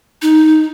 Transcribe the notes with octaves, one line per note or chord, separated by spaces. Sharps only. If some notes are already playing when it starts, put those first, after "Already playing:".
D#4